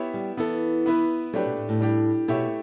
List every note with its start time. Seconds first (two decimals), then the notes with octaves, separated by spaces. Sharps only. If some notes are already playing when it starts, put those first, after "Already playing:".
Already playing: B3 E4 G4 C#5 E5
0.14 G3
0.37 E3 B3 E4 A4
0.86 B3 E4 B4
1.33 F#3 A3 D4 G4 B4
1.45 B2
1.57 A2
1.69 A2
1.80 G3 D4 G4
2.28 B2 A3 E4 G4 C#5 E5